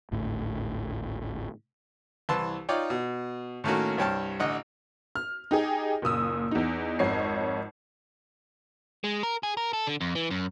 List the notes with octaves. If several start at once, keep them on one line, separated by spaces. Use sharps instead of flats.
G#1 D2 A2
C2 E3 B4 A5 C6 E6
D#4 F4 C#5 D5 G5
B2
A2 D#3 A3 A#3 C#4 F#4
C2 G2 C#5 G5 A5 F6
A1 D3 D#5 F#5
F6
D#4 G4 G#4
F#1 A#2 D#6 E6
E2 D#4
G#1 F2 C#5 D#5 C7
G#3
A#4
G#4
A#4
A4
D3
F2
E3
F#2